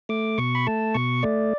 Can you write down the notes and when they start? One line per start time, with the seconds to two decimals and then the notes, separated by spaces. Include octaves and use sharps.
0.09 A3 D6
0.38 B2 C#6
0.55 B5
0.67 A3 A5
0.94 B2 C#6
1.23 A3 D5